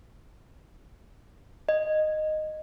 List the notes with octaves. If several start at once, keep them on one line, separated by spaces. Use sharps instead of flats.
D#5